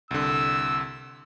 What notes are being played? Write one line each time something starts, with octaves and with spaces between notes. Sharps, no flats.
C2 D3 E6